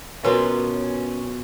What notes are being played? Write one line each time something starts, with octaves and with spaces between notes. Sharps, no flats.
B2 F#3 C#4 F4 F#4 A#4 B4